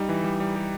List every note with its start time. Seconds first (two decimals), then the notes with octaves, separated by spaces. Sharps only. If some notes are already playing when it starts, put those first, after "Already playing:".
Already playing: G3 D#4
0.09 E3
0.24 G3
0.40 G3
0.56 G4